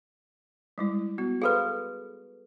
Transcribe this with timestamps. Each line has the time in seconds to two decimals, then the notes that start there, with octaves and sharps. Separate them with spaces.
0.78 G3 G#3 E4
1.18 B3 F#4
1.42 G#4 A4 B4 F5 B5 C6